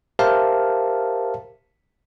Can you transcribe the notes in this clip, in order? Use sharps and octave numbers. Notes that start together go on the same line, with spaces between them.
G4 A#4 C5 E5 F5 A5